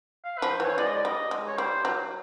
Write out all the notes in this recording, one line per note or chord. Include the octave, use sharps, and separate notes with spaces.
F5
F3 B4
C5
E3 C#5
G#3 D5
D#5
D5
G3 D#5
G#3
C#5
G3 C5
F#3